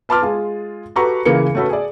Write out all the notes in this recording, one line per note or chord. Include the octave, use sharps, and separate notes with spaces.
B4 A5 C6 D6 F6 A6
G#3 F4 G#4
F#4 G4 A4 B4 A#5 C#6
C#3 E3 A#3 A#4 C#7
A3 C#4 F#4 A4 B4
G#4 D5